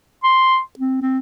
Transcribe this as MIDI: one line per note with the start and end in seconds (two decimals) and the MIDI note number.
0.23 0.59 84
0.79 0.97 60
1.02 1.19 60